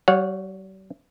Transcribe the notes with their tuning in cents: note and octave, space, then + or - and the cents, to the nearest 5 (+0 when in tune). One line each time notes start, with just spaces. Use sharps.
G3 -45 C#5 +0 F#5 -35